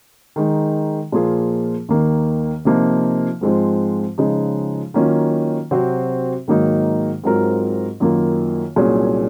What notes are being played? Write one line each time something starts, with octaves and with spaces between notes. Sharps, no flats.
D#3 G#3 D#4
A#2 F3 A#3 F4 G#4
D#2 D#3 A#3
C3 F3 A#3 D#4
G#2 F3 G#3 C4 F4
C#3 F3 G#3 D#4
D#3 F#3 A#3 C#4 F4
C3 F#3 C4 F#4 C5
G#2 D#3 F#3 A#3 D#4
G#2 F#3 C4 F4 A#4
F#2 D#3 A#3 F4 A#4
C2 A#2 F#3 C#4 G#4